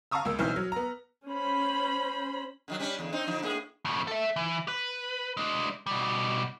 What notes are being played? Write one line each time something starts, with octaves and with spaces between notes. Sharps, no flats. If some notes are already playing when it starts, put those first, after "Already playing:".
F5 A5 A#5 C#6 D#6 E6
C#2 A#3 E6
B1 E3 C4 D#4 F6
F#3
B3 A#5
C#4 C5 B5
D3 D#3 F#3
G3 C#4 D4
E2 D3
C4 D#4 C5
D3 F3 D#4
A2 A#3 G#4
F2 A2
A4 E5
E3
B4
G#3 D4
B2 G3